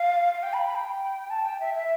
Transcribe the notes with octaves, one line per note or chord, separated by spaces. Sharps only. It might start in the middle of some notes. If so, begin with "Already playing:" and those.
Already playing: F5
F5
G5
B5
B5
G5
A5
G5
E5
E5